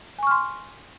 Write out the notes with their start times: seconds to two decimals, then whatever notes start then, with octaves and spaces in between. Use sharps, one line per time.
0.18 G#5
0.23 C#6
0.27 F6
0.31 C6